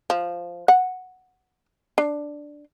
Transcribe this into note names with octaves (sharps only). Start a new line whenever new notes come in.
F3
F#5
D4